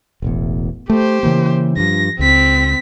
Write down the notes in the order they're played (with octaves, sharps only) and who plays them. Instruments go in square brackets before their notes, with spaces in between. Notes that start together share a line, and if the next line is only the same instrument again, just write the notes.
[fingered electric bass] E1 A1 E2
[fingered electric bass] A3 [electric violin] G4 C5
[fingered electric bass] C#3 E3 A#3
[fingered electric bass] G2 F3 [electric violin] A#6
[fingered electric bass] C#2 [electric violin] C4 B6